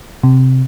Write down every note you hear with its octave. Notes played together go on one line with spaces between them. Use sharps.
C3